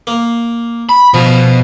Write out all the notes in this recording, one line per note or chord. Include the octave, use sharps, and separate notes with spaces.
A#3
B5
B2 F3